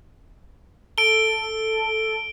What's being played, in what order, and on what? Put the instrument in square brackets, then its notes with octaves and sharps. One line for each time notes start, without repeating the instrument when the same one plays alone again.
[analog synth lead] A4 [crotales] D7 G7